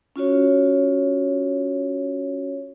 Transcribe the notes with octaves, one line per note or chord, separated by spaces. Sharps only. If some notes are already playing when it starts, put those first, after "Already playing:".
C#4 F4 F#4 C#5